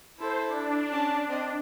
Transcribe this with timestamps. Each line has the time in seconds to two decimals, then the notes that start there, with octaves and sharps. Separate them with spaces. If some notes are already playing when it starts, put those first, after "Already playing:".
0.19 E4 A4 C5
0.48 D4
0.90 C#4 A5
1.29 C4 D#5